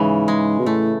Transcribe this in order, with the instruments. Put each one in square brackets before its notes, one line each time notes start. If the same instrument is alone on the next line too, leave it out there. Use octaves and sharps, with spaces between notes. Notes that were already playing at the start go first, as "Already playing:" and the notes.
Already playing: [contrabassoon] G#2 [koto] C#3 E3
[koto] G#3
[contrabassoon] B2
[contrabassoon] A2 [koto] A3